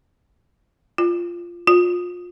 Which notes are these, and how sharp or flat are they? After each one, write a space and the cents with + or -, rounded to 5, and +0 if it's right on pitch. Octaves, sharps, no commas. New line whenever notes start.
F4 -10
F4 +25